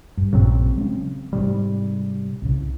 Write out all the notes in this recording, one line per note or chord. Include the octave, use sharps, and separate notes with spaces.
G2
A#1 C#3 F#3 C4
G#3 C#4
G#2 C3 G3
C2 C#3